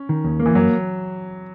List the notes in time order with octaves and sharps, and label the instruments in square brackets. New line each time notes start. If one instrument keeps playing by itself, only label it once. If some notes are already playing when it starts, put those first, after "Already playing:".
Already playing: [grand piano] C#4
[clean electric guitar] D#3
D#2
A#3
[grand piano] E3
[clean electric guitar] F#2 [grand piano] F#3